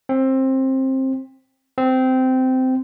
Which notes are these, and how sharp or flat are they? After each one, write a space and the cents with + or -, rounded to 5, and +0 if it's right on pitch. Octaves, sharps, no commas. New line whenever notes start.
C4 +20
C4 -15